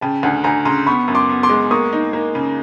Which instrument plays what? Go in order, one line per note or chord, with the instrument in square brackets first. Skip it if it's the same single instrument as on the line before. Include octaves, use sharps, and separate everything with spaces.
[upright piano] C#3 [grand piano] G5 A5
[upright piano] D2 [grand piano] F#5 G#5
[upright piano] D2 [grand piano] G#5 A#5
[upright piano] C#3 [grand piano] A#5 C6
[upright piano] B3 [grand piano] B5 C#6
[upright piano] F#2
[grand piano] C6 D6
[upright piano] B3
[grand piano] C6 D6
[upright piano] G#3
[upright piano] A#3 [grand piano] C#6 D#6
[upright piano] D#4
A#3
C#3